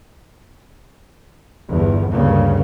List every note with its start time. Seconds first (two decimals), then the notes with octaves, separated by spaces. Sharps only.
1.70 G1 E2
2.13 D2 G2 C#3 A#3